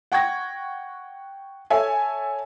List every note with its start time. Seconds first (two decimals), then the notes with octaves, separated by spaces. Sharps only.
0.12 F#5 G5 C#6 G#6 A#6
1.70 A4 C#5 E5 G#5